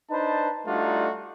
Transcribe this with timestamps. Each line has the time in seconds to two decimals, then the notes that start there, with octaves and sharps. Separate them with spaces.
0.11 D4 D#4 B4 C5 A5
0.66 G3 A3 D4 D#4 F4 F#4